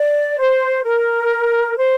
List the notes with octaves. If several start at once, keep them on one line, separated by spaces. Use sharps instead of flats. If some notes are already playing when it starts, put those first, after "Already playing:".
Already playing: D5
C5
A#4
C5